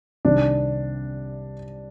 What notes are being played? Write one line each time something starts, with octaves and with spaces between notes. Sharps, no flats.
C2 C3 D#3 G3 D4